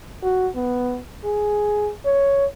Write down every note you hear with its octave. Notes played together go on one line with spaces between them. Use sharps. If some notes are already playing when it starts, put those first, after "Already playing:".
F#4
B3
G#4
C#5